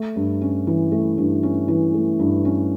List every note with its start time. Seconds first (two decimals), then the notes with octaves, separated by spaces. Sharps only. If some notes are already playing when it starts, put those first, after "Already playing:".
Already playing: A3
0.16 G2
0.41 C#4
0.67 E3
0.92 A3
1.18 G2
1.43 C#4
1.68 E3
1.94 A3
2.19 G2
2.45 C#4